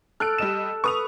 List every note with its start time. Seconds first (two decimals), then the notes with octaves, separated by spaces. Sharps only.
0.20 A4 F6 F#6 D7
0.38 G3 D#5 E7
0.84 B4 C#6 D#6 F7